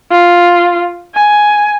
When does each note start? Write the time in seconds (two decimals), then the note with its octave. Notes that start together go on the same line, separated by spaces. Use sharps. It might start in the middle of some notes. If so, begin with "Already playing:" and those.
0.11 F4
1.15 G#5